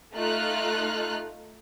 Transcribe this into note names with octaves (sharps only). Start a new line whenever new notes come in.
A3 D#4 F4 F6 F#6